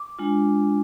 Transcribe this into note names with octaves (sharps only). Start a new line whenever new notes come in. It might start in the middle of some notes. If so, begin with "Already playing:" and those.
Already playing: D6
G#3 D4 F4